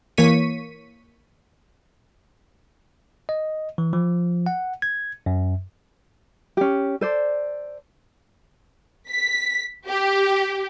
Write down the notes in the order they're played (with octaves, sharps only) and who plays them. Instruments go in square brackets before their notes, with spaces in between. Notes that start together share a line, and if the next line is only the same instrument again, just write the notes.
[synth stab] E3 A#3 C#5 C#6 B6 D#7
[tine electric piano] D#5
E3
F3
F#5
G#6
F#2
[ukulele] C#4 G4
A4 C5 D5
[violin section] B6
G4